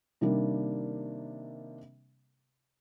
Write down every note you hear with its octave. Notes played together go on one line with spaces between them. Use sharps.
C3 D#3 G3 A#3 D4